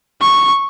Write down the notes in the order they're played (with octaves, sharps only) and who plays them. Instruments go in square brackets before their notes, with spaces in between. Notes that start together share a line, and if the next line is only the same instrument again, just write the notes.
[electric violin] C#6